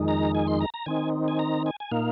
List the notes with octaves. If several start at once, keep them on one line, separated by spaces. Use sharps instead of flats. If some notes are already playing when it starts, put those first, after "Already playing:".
Already playing: F2 D#3 G#3 D#4
A#5
G#5
C6
A#5
A#5
D#3 C4 D#4 G#5
G#5
A#5
G#5
G#5
A#2 A#3 D#4 F5